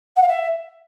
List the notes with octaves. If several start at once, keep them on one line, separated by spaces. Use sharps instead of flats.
F#5
F5
E5